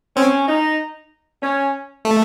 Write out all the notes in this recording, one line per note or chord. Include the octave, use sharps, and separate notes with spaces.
C4 C#4
D#4
C#4
A3